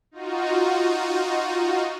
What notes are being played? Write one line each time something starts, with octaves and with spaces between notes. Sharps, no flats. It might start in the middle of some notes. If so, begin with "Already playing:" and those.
D#4 F4 F#4